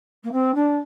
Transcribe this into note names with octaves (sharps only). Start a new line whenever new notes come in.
A#3
C4
D4